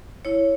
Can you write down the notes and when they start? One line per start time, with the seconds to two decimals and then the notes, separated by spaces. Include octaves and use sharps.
0.25 E4 C#5